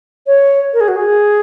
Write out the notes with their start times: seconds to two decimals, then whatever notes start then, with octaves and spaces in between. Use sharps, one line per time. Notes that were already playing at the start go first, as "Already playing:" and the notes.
0.27 C#5
0.73 A#4
0.81 G#4
0.88 F#4
0.96 G#4